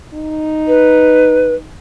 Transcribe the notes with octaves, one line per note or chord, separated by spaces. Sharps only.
D#4
B4